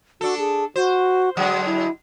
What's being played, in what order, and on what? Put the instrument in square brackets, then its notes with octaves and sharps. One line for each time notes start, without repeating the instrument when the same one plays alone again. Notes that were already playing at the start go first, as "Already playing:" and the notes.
[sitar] D4 A4 [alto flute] F#4
[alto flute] G#4
[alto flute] F#4 [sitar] C5
[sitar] D3 F#3 G#3 [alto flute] F#5
[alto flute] E4